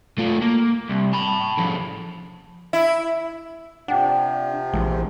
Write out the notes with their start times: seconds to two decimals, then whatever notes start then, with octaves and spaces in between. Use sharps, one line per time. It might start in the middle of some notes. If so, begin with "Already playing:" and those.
0.18 A3 F4
0.42 A#3
0.90 C2
1.14 A5 B5
1.58 A2 F3
2.73 E4
3.88 C3 F3 D4 F#5 G5
4.73 A#1 E3 G#3